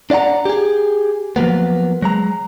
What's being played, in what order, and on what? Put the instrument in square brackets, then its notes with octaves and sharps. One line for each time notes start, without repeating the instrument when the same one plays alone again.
[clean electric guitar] D4 D5 D#5 F#5 A#5
G4 G#4
F3 F#3 A#3 B3
F#3 G#3 A#5